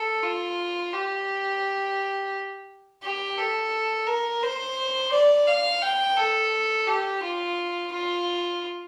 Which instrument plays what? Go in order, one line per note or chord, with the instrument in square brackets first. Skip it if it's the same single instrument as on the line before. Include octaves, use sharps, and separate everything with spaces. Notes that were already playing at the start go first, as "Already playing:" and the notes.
Already playing: [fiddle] A4
F4
G4
G4
A4
A#4
C5
D5
F5
G5
A4
G4
F4
F4